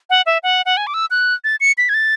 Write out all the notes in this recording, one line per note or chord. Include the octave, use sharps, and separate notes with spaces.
F#5
E5
F#5
F#5
G#5
D6
E6
F#6
A6
C#7
B6
G#6
A6